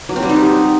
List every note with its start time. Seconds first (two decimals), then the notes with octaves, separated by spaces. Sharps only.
0.09 F#3
0.16 C4
0.23 G3
0.29 D#4
0.36 F#4